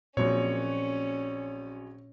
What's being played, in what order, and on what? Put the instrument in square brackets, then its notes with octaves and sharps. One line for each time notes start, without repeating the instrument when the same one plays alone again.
[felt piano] A#1 F#3 C4 [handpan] A#2 [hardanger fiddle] C#4 [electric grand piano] C#5